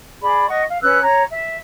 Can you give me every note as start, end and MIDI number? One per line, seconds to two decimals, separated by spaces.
0.23 0.47 68
0.23 0.47 74
0.23 0.47 83
0.48 0.63 75
0.48 0.63 78
0.48 0.63 85
0.68 0.78 77
0.82 1.00 61
0.82 1.00 71
0.82 1.00 88
0.82 1.00 90
1.02 1.23 73
1.02 1.23 82
1.31 1.56 76